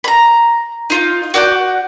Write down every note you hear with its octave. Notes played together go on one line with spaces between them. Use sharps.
A#5 B5
D#4 F4
F#4 D5 F#5 G6